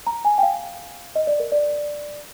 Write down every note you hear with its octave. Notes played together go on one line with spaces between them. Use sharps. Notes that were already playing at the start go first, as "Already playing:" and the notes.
A#5
G#5
G5
F5
D#5
D5
A#4
D5